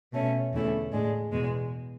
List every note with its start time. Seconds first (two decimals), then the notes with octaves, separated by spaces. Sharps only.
0.13 B2 A3 C#4
0.52 E2 D3 A3 C#4 E4
0.92 A2 G#3 D4
1.32 E2 B2 G#3